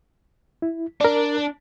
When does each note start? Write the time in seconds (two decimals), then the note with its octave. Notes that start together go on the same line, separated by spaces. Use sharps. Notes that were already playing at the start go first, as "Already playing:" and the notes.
0.62 E4
1.01 D4 A#4 D5